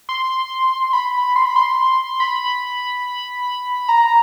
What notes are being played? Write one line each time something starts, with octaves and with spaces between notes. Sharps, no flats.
C6
B5
C6
B5
C6
B5
A#5